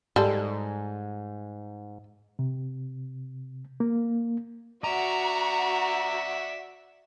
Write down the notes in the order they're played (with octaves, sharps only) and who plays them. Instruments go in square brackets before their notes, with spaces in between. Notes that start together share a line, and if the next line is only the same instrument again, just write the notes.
[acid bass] G#2 [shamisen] G3 G#3 A4
[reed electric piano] C3
A#3
[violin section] F#4 [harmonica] D5 E5 [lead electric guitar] A#5